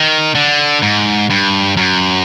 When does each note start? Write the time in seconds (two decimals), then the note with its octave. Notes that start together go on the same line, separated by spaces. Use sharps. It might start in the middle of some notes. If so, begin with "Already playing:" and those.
Already playing: D#3
0.35 D3
0.82 G#2
1.30 G2
1.77 F#2